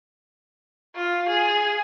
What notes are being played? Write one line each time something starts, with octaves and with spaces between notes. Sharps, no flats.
F4
G#4